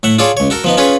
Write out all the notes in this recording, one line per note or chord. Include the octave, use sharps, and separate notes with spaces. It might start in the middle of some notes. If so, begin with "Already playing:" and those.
A2 E5 F#5
F4 G#4 A4 C#5 D5
C#2 C#5
F#4 A4 A#4
F3 B3 D#4
C#4 F4 G#4 B4 C#5